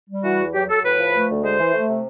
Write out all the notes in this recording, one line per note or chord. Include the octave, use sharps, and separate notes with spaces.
G3
E3 F#4
E2
F#3 G4
F#3 A4
A2 B4
F3
A3
D2
G#3 C5
E3
A3
C3